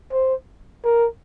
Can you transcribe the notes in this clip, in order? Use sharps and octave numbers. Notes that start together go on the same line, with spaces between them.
C5
A#4